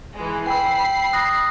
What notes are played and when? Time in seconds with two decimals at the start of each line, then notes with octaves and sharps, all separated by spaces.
0.15 E3 G#3
0.46 G5 B5 E6 C7
1.13 D#6 F#6 A#6